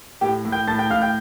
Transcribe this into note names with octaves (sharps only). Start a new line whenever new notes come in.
A2 G4 G5
A2
G5 G6
A2 A5 A6
G5 G6
A2 F5 F6
G5 G6